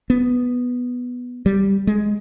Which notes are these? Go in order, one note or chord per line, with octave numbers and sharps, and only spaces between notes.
B3
G3
G#3